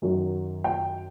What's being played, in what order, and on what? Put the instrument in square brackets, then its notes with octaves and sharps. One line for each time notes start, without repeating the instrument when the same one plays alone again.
[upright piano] F#2 D#3 F#3
G5